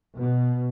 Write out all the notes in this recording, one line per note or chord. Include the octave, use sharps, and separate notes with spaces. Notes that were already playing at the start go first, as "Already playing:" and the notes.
B2